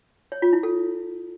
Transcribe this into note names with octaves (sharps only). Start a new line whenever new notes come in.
C#5
F4
E4
A4